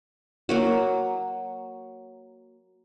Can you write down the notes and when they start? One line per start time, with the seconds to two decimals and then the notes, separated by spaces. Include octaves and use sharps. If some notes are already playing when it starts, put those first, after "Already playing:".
0.49 F#3 A#3 F#4